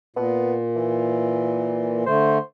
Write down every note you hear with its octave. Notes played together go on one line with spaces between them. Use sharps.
A#2 B3
E3
D3 A3 C5